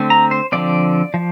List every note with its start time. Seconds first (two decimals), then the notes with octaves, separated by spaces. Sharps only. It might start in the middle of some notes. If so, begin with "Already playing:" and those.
Already playing: D3 A3 C4
0.10 A#5
0.31 C5
0.52 D3 F3 C4 D5
1.14 F3